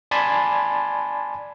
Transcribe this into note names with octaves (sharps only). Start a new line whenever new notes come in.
D5 G#5 A5 B5 C6 G#6